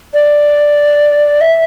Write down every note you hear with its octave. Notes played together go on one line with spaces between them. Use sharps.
D5
E5